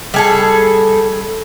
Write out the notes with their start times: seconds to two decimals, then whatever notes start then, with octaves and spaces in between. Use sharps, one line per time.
0.14 G3 G#4 A4